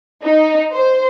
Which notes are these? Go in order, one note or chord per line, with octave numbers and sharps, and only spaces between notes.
D#4
C5